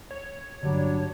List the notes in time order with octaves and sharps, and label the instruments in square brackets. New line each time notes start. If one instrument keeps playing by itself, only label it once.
[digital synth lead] C#5
[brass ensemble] A1 G3 D4 [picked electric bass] G2 D3 [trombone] F#3